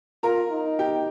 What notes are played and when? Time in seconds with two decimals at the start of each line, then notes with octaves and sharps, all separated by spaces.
0.23 F4 A#4 A#5
0.51 D#4
0.79 G4 G5